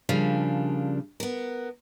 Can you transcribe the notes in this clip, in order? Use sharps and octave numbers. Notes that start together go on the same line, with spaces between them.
C#3 F3 G3 A#3 D4
B3 A#4